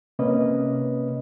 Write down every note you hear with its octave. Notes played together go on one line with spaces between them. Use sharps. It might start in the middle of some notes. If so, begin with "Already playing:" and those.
C3 A#3 C#4 B4 D#5